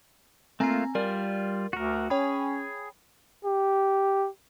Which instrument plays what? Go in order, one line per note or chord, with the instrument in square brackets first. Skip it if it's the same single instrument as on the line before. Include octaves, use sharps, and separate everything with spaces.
[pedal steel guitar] A3 A#3 F4 [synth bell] C4 G#5 A#5
[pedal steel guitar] G3 F4 [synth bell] A#4 D5
[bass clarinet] D2 [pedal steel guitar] F#4 A#4
[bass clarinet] C#4 [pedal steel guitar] G#4 [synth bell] C#5 G5 B5
[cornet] G4